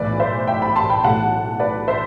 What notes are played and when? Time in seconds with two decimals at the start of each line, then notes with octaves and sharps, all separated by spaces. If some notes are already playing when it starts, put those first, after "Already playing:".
Already playing: B1 A2 E3 B4 D5
0.20 C5 E5
0.47 E5 G5
0.62 G5 B5
0.76 A5 C6
0.90 G5 B5
1.03 B1 A2 E3 A3 F#5 A5
1.60 B4 D5
1.88 C5 E5